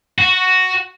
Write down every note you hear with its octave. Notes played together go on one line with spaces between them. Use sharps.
F#4